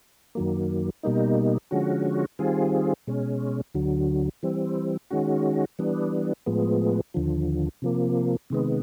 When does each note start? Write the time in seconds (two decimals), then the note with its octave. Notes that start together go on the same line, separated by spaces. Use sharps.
0.35 F#2 D#3 F#3 A#3
1.03 B2 G3 A#3 D#4
1.71 D3 F3 G#3 C#4 F#4
2.39 D#3 G3 C4 F4 G#4
3.07 B2 G#3 C#4
3.74 D2 D3 F#3
4.43 E3 G3 C4
5.11 D#3 G#3 C#4 F#4
5.79 E3 G3 B3 D4
6.46 A2 F3 G#3 B3
7.14 D#2 D3 F3
7.82 C3 F3 A#3
8.50 C3 D#3 G#3 B3